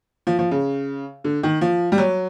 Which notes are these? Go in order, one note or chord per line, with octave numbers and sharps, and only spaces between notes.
F3
F3
C#3
D3
D#3
F3
G3
F#3